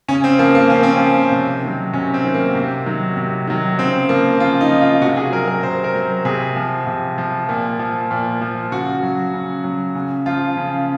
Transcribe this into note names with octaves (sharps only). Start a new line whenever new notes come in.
C#3 C#4
C4
F3 A#3
A#3
C#3 C#4
C4
F3 C#4
C3
D#3 F#3
C3 C#4
C4
D#3 F#3
A#3
C3
D#3 F#3
C3
D#3 F#3
C#3 C4
F3 A#3
C#3 F4
D#4
F3
F4
C3 F#4
G#4
F#3 A#4
A#4
C3 C5
A#4
F#3
C3 G#4
F3
C3
F3
A#2
F3
A#2
F3
C#3 F#4
F#3
C#3
F#3
C#3
F3 F4
C#3